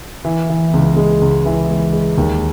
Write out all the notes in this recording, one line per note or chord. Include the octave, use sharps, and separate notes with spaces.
E3
E3
C#2
G#3
C#2
E3
G#3
G#3
D#2